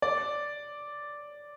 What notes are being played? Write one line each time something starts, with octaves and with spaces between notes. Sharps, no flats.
D5